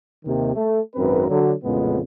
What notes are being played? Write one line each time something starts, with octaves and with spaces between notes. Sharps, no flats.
D#2 C3 D#3
A3
G#1 F#2 C4 A#4 B4
D3 F#3
A1 F2 A#2 C#3 G#3 B3